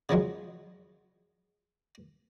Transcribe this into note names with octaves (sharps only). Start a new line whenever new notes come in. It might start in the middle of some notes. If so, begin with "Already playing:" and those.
C#3 F3 F#3 G#3